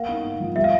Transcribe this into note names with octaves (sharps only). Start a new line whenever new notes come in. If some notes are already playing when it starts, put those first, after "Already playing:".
Already playing: A#3 F5 F#5
D#4
G#2
F3
G3 E5
F5